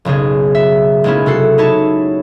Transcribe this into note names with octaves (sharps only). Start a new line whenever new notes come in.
F#1 B1 C#3 G#4
E5
B1 G#3 A#3 C#4 E4
C3 F#4 A4 C7
D#4 E4 C#5 A5